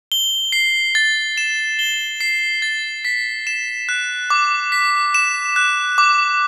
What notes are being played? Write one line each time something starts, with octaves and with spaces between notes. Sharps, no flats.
G7
C7
A6
E7
G7
C7
A6
B6
E7
F#6
D6
B6
E7
F#6
D6